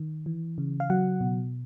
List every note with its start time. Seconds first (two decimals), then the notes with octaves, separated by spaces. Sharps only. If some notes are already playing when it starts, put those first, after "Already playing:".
Already playing: D#3
0.26 E3
0.58 C#3
0.80 F5
0.90 F#3 F#5
1.21 B2